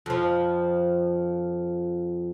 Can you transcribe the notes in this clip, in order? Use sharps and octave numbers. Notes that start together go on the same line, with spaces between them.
F2 F3